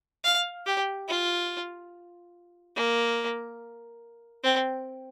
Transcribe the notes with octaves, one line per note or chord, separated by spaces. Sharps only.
F5
G4
F4
A#3
C4